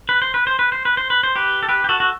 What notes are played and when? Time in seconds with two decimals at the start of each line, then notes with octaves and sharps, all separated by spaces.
0.09 B4
0.22 C5
0.34 B4
0.47 C5
0.59 B4
0.72 C5
0.85 B4
0.97 C5
1.10 B4
1.23 C5
1.36 G4 B4
1.63 A4
1.69 G4 B4
1.84 G4
1.89 F#4 A4
2.00 F#4